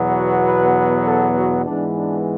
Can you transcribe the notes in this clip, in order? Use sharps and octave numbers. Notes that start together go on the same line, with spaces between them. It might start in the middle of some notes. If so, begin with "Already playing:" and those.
Already playing: E2 B2 F#3 B3
F#4
B4
B4
A4
F#4
G#2 E3 G#3 B3 D4
D4